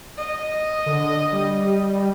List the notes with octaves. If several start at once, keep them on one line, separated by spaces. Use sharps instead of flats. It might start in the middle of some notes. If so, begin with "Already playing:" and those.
D#5
D3
G3